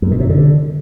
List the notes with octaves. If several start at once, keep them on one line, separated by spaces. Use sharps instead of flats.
F#2
B2
C3
D3